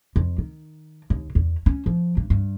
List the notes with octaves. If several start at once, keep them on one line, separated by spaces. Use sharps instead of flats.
F2
D#3
D#2
E2
C#4
F3
G2
G2